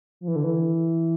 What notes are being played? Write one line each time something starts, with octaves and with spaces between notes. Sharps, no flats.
F3
E3
D3
E3